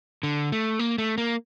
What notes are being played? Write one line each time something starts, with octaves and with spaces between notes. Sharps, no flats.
D3
A3
A#3
A3
A#3